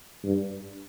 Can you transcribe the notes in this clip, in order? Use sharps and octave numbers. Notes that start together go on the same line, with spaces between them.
G2